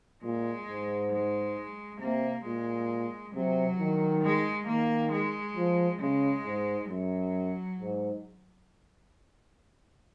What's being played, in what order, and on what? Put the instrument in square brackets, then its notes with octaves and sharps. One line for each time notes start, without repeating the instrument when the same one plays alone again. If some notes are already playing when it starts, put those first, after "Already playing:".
[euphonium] A#2 [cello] G#3
[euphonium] G#2
[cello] G#3
[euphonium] C3 [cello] A#3
[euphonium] A#2 [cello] G#3
[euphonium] C3 [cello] F#3
[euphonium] D#3
[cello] G#3
[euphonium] D#3 [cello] A#3
[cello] G#3
[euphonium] F3
[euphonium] C#3 [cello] G#3
[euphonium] G#2
[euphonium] F#2 [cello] F#3
[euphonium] G#2